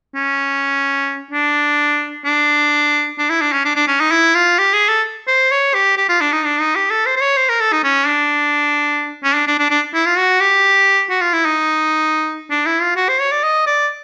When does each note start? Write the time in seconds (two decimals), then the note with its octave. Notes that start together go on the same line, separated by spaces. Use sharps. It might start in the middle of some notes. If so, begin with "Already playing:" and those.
0.15 C#4
1.31 D4
2.25 D4
3.18 D4
3.30 E4
3.41 D4
3.52 C#4
3.65 D4
3.76 D4
3.88 C#4
4.00 D#4
4.11 E4
4.35 F4
4.58 G4
4.73 G#4
4.88 A4
5.27 C5
5.51 C#5
5.74 G4
5.98 G4
6.09 F4
6.21 D4
6.33 D#4
6.44 D4
6.60 D#4
6.76 G4
6.90 A4
7.06 C5
7.16 C5
7.21 C#5
7.37 C5
7.49 A#4
7.60 A4
7.72 D#4
7.84 C#4
8.07 D4
9.24 C#4
9.35 D4
9.47 D4
9.59 D4
9.70 D4
9.94 E4
10.06 F4
10.18 F#4
10.40 G4
11.10 F#4
11.21 F4
11.33 E4
11.45 D#4
12.50 D4
12.66 E4
12.81 F4
12.96 F#4
13.09 C5
13.20 C#5
13.32 D5
13.43 D#5
13.67 D5